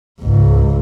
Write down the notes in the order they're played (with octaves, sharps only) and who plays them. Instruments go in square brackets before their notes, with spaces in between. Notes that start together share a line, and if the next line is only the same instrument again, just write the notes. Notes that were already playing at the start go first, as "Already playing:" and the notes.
[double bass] C#2 G#2